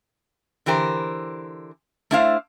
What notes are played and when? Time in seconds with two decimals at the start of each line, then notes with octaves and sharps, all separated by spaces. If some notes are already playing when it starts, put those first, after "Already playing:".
0.66 D3 E3 G4 A#4 C5
2.11 A3 D4 E4 C5 F5